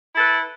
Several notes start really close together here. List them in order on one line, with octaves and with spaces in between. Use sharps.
E4 A4 B4